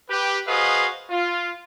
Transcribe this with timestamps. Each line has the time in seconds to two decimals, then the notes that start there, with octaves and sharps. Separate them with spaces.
0.10 G4 B4
0.48 F#4 G#4 B4 C5 D#5 F5
1.10 F4